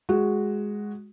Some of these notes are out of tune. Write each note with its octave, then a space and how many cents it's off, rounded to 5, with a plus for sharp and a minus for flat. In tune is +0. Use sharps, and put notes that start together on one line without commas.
G#3 +0 F#4 +0